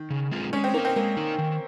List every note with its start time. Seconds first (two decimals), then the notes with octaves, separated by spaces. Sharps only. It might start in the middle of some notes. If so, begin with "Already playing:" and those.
Already playing: D#3
0.10 C#3
0.31 G#3 C4 F4 G#4
0.53 G#3 C#4
0.64 C4
0.74 A#3 D#4 A#4
0.85 C4
0.96 G#3 A#3
1.17 D#4 A#4
1.38 D#3